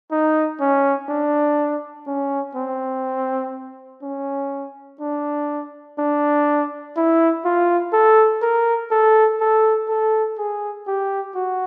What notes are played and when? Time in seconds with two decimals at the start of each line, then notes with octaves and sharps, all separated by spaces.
0.11 D#4
0.61 C#4
1.09 D4
2.07 C#4
2.55 C4
4.03 C#4
5.01 D4
5.99 D4
6.96 E4
7.45 F4
7.93 A4
8.42 A#4
8.91 A4
9.41 A4
9.89 A4
10.38 G#4
10.88 G4
11.36 F#4